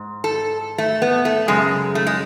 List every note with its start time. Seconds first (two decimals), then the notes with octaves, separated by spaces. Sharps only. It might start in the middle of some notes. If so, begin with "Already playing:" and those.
Already playing: G#2
0.24 A4
0.78 A3
1.02 B3
1.25 A3
1.48 F#2 C#3 G#3
1.95 A3
2.07 G#3